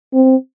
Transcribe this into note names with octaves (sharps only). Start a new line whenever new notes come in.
C4